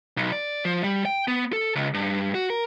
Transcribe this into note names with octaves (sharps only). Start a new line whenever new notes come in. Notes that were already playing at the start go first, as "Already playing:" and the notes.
B1
D5
F3
G3
G5
B3
A4
C#2
G2
F#4
A#4